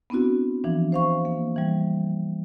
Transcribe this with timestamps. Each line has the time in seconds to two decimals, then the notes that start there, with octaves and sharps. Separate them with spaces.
0.10 B3 C4 D4 E4 F#4
0.64 E3 F3 D4
0.92 C5 F5 C#6
1.25 A#3
1.56 E3 G3